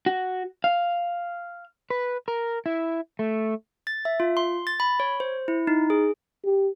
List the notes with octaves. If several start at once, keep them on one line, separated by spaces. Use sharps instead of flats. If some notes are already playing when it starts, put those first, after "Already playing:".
F#4
F5
B4
A#4
E4
A3
A6
E5
F4
C6
A6
B5
C#5
C5
E4
D#4
G#4
G4